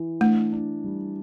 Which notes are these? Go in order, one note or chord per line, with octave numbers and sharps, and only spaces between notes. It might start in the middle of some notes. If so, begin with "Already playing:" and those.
Already playing: E3
A3 D4
D4
G3